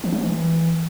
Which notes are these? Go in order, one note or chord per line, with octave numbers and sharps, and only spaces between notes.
E3
F#3
E3